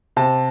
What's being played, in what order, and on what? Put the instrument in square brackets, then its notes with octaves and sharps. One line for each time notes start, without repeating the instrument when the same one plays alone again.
[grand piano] C3 A5